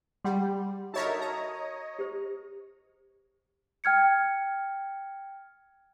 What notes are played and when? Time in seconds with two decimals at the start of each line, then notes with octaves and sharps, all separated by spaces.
0.25 G3 G4 F#5 C6
0.94 D3 D#4 F#4 A#4 C#5 E5 A5 B5
1.21 C#5 D#5 A#5
1.99 G4 C5
3.84 G5 F6 G#6 C#7